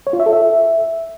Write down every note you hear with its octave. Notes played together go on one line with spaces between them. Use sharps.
C#5
F4
E5
A4
E5